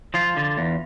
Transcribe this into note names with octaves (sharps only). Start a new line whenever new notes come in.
F3 F4
D3
E2